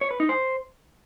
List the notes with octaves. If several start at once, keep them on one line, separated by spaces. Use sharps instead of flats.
C#5
B4
D#4
C5